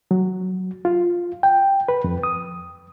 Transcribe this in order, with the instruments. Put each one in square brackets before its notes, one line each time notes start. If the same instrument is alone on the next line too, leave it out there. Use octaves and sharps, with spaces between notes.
[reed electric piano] F#3
F4
G5
B4
F2
D#6